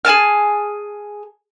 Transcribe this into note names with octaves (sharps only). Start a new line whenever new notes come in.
G#4 G#5 A5 F6